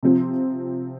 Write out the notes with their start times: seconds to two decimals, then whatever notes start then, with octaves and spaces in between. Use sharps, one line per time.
0.03 C3 F3 C4